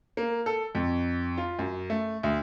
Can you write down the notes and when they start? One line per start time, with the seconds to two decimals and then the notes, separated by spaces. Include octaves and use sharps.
0.17 A#3
0.46 A4
0.75 F2
1.38 F4
1.59 F#2
1.90 A3
2.23 D2